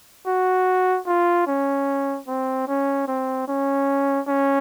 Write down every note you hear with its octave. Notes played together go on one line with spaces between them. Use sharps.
F#4
F4
C#4
C4
C#4
C4
C#4
C#4